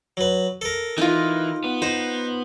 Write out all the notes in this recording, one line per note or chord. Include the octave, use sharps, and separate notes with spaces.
F#3 B4
A4 A#4
E3 D#4 F4
B3
D#4 C5